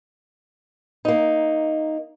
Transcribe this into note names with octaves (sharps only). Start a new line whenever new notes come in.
A#3 D#4